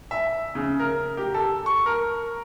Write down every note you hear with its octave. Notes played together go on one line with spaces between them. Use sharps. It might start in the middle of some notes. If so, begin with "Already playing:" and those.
E5
C#3
A#4
G4
A4
C#6
A#4